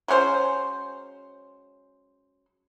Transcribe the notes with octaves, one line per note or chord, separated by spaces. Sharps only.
F#3 G#3 C#4 C5